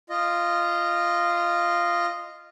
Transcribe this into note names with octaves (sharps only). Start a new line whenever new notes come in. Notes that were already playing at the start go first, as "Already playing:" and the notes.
F4 D#5